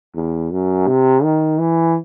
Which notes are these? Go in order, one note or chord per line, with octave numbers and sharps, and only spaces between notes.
E2
F#2
C3
D#3
E3